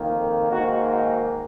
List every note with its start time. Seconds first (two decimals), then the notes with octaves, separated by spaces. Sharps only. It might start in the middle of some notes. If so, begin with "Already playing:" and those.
Already playing: F2 D#3 A#3
0.50 G#2 D#3 A#3 F#4
0.91 F#4